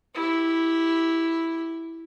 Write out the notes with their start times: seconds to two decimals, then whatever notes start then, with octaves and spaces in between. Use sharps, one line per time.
0.15 E4 G4